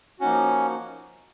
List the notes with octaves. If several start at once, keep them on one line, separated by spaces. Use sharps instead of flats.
F3 A#3 C#4 D#4 F#4